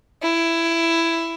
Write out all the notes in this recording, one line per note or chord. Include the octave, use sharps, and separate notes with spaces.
E4